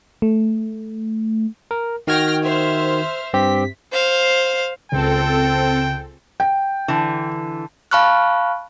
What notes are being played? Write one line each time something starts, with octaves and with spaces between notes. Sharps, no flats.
A3
A#4
D#3 F#4 G5 F6 G#6 A#6
C5 E5 F6
G2 C4 G4 B6
C5 F5
C#2 C4 A4 G5
G5
D3 E3
F5 A5 B5 C#6 F6 F#6